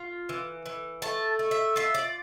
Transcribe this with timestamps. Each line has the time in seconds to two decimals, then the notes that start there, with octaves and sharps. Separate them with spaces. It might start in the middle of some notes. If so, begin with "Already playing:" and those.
Already playing: F4 F5
0.29 E3
0.66 E3
1.02 A3 A5
1.39 A3
1.51 E5
1.76 F4 E5
1.95 D5